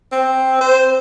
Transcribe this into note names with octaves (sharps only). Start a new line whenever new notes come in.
C4
C5